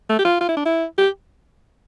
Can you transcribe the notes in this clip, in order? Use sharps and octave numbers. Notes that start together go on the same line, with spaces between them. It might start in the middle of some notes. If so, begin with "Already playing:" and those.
A3
G4
F4
F4
E4
D4
E4
G4